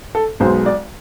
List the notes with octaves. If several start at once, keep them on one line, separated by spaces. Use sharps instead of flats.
A4
B1 B2 G#3 C5
D5